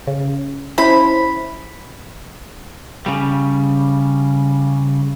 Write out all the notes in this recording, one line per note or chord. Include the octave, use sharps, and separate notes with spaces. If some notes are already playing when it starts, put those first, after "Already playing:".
C#3
C#4 E4 C5 B5
C#3 G3